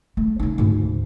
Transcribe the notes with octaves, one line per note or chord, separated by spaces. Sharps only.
A3
C#3 D#4
D2 G#2